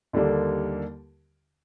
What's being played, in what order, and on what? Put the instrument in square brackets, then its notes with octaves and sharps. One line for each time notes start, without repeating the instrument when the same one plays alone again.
[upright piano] D#2 D3 G3 A#3 D4